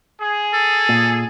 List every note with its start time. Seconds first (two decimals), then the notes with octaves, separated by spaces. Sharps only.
0.21 G#4
0.54 A4
0.89 A#2